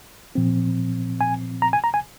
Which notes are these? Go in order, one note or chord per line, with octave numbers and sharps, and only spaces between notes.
A#2 F3 C4
G#5
A#5
G#5
A#5
G#5